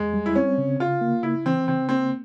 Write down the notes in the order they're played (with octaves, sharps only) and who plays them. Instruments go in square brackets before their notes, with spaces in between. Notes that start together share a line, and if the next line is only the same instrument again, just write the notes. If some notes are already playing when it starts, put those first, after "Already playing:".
Already playing: [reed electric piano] E2 [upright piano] G#3
[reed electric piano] G3
[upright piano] E4
[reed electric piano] C4 [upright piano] C#4
[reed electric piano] C#3
[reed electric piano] C#3 [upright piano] F4
[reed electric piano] A#3
[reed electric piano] C#3 [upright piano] E4
[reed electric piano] E3 [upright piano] C4
[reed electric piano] C#3 [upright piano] C4
[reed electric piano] A#3 [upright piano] C4